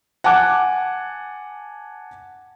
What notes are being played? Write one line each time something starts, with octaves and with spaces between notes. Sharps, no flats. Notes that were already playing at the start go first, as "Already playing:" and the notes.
F#5 G#5 A5 D6 F#6